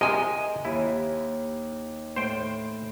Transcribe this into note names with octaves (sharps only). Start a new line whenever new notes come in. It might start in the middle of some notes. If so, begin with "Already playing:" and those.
C3 G#3 A#4 D#5 G#5
D#2 E4
A2 C5 G5